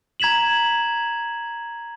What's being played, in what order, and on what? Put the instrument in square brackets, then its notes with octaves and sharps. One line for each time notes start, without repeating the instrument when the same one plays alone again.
[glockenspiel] A#5 G#6 B6 E7 F#7